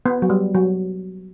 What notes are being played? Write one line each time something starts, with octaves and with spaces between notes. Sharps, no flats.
B3
F#3
G3
F#3